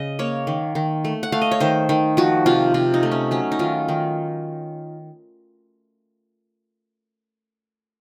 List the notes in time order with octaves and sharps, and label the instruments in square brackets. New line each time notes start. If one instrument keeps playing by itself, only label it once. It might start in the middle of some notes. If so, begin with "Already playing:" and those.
Already playing: [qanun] C#3 D#5
A#3 C#5
D#3
D#3
A3
F#5
A3 F5
D#5
C#5
D#3 C5
D#3
F3 F#4
C3 F4
C3 F4
D#4
A3
C#4
F#3 C#4
D#4
D#3 F4
D#3